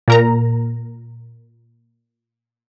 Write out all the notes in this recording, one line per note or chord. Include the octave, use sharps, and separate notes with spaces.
A#2 A#4 A#5